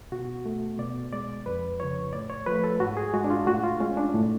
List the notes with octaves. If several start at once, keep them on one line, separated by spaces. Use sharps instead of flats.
B2 F#4
A3
B2 D5
G#3 D5
F2 B4
C#3 F3 C#5
A2 D5
C#5
F3 A3 B4
A4
G#2 F#4
G#4
G#3 F#4
D4
F4
A2 F#4
F4
G#3 C#4
D4
A2